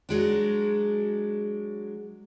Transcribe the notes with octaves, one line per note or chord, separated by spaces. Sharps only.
F#3 G#3 D4